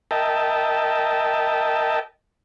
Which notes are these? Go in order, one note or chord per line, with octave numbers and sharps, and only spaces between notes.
A#4 D#5 E5 G5 A5